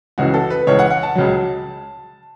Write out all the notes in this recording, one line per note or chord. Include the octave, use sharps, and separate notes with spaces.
C#2 C#3 E3 F#4
A4
B4
C#2 C#3 E3 C#5
F#5
F#5
A5
C#2 C#3 F#3